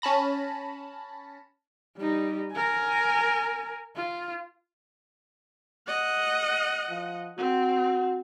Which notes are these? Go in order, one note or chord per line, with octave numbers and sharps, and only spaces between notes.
C#4 A5 B5 A#6
G3 D#4
A#4 G#5
F4
D#5 F#5
F3
C4 F#4